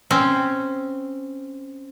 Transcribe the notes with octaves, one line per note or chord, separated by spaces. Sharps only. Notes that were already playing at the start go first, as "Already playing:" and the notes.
C4 C#4